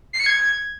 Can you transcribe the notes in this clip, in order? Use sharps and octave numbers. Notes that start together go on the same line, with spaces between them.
C7
C#7
G#6